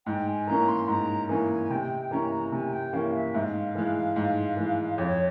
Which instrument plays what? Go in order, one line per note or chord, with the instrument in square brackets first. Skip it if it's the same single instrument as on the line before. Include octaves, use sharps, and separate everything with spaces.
[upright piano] G#2 [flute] G5
[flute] G#5
[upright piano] E3 A#3 C#4 [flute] A#5
[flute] C6
[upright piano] G#2 [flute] A#5
[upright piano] E3 A#3 C#4 [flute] G#5
[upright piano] C3 [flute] G5
[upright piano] E3 A#3 C#4 [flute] A#5
[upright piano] C3 [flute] G#5
[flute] G5
[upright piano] E3 A#3 C#4 [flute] F5
[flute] E5
[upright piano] G#2 [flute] F5
[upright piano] E3 G#3
G#2
E3 G#3
[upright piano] F2 [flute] C#5